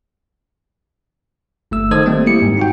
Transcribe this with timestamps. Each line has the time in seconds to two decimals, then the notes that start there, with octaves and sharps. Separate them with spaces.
1.71 G1 A3 E6
1.91 D#3 A4 C5 D#5 D#6 G#6
2.06 G3 A3 A#3 C4
2.26 A#3 E4 G4 C#7
2.42 G#2
2.57 D#4 F#4 G5